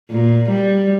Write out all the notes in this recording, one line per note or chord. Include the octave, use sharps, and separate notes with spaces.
A#2
G3